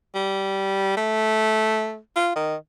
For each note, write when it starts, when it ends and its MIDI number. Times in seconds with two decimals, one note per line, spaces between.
0.15 0.92 55
0.97 1.98 57
2.16 2.31 65
2.36 2.55 51